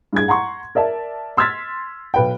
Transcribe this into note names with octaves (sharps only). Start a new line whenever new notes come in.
G2 G#4 G#6
F#5 A#5 C6 C#6
A#4 D5 E5 A5
C6 E6 F6 G#6 A6 B6
B1 B4 G5